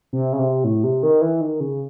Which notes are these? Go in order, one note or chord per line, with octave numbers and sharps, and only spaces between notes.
C3
C#3
C3
A2
C3
D#3
E3
D#3
C#3